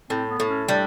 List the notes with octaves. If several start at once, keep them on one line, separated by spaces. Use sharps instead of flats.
A2 C4
B3
A2
C#4
G3 D4